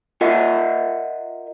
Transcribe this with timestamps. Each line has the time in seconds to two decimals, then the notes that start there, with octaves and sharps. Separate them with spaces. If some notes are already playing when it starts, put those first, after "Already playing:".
0.21 F4 A#4 D#5 E5 F#5